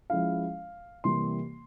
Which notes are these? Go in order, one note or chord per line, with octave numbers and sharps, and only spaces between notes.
F3 G#3 C#4 E4 F5
C3 E3 G3 A#3 C6